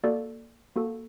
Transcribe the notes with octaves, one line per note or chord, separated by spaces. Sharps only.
A#3 F#4 A4 D5
A#3 F#4 A4